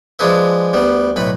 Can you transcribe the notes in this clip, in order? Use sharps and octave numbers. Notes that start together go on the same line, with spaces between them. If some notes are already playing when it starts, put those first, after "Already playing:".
F3 G#3 D4 G#4 B4 E5
D2 G3 B3
B1 A2 B4 B5